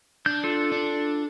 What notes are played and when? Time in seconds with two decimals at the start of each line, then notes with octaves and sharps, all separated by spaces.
0.26 D4 G6
0.44 F4 A4
0.72 D4